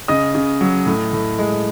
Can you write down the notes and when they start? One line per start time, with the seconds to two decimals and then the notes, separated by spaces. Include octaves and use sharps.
0.08 C#3 D#5 D#6
0.35 C#3
0.61 F#3
0.86 A2
1.13 A2
1.39 G#3